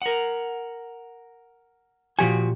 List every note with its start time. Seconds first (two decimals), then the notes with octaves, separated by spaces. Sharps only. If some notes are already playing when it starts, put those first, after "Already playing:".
0.02 A#4 F#5
2.19 A#2 F3 F#4 G4 G#5